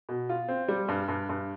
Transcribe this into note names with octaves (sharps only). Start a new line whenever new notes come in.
B2
F4
C4
G3
G2
G2
G2